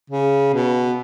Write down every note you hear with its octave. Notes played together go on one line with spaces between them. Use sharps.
C#3
B2